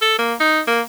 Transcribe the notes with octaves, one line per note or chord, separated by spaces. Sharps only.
A4
A#3
D#4
A#3